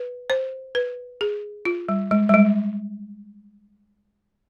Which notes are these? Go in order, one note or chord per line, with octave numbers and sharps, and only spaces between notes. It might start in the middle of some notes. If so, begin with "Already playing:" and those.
Already playing: B4
C5
B4
G#4
F4
G3
G#3
G3
G#3